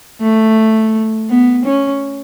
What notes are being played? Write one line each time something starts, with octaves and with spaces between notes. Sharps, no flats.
A3
B3
C#4